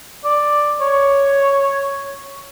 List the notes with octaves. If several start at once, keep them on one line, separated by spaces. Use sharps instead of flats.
D5
C#5